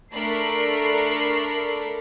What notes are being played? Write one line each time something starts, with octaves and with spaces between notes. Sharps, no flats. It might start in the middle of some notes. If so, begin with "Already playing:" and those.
A3 D4 A4 A#4 B5 C7